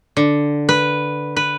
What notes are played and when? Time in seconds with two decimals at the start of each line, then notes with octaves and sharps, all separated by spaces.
0.17 D3
0.69 B4
1.36 B4